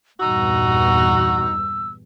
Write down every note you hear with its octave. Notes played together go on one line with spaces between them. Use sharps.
E2 G2 A#2 D#4 F#4 E6